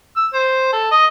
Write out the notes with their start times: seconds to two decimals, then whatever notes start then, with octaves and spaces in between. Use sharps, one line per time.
0.16 E6
0.33 C5
0.73 A4
0.91 D#5